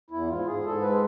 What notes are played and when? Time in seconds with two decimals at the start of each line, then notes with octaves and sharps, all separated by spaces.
0.10 E2 E4
0.28 G#2 F4
0.46 G#2 G#4
0.65 G#2 A4
0.82 G#3 B4